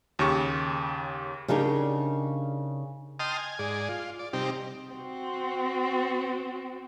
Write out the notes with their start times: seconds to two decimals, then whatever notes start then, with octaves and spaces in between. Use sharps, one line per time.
0.19 D#2 C#3 G4 C#6
1.48 C#3 D4 D#4 G4 G#4 A#4
3.20 D#5 G5 A5 C6 D#6 F6
3.37 G#5
3.59 G#2 G#4 D5
3.89 F4
4.19 D5
4.33 C3 G3 C4 D#4 G4
4.92 C4 F#4